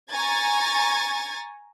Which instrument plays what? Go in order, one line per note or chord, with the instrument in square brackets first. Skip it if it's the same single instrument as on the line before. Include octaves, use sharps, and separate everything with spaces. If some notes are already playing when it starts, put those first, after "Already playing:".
[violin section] G#5 A#5 C#6 G#6 A6